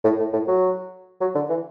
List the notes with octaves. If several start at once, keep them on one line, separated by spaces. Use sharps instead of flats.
A2
A2
A2
F#3
F#3
D3
E3